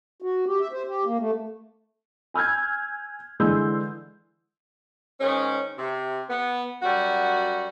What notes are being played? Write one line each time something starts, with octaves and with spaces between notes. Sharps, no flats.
F#4
G4
E5
C5
G4
A#3
A3
G#5 E6 F6 G6 G#6
D3 E3 G#3 C6 E6 G6
G#2 D#3 C#4
C3
B3
F#2 G3 F#4